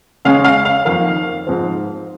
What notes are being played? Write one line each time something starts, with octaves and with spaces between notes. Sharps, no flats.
C#3 G#3 C#4 F5
F5
F5
F2 D#3 A#3 F5
G#2 F3 C4